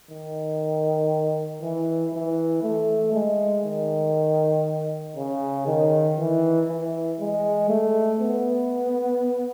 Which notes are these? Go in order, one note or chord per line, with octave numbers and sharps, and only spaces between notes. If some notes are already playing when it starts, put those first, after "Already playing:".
D#3
E3
E3
A3
G#3
D#3
C#3
D#3
E3
E3
G#3
A3
B3